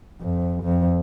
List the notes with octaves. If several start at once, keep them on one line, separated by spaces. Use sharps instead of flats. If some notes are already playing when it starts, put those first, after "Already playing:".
F2
F2